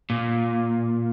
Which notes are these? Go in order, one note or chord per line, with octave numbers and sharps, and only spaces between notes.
A#2